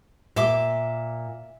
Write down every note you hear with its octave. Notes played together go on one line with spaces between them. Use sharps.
A#2 E5 C6 D6